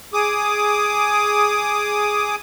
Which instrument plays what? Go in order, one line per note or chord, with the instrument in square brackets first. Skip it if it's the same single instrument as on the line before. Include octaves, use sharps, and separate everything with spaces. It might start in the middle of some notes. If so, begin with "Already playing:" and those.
[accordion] G#4 D6 D#6